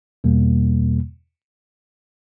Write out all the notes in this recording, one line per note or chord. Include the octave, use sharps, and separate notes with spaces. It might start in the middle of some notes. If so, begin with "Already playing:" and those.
E2 B2 G3 A#3